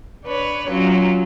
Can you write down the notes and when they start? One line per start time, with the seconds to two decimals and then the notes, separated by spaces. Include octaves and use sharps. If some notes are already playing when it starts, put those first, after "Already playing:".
0.25 D4 B4 C#5
0.68 F#3 C#4 F4